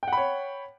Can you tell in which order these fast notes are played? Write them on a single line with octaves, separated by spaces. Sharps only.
G5 F#5 B5 C#5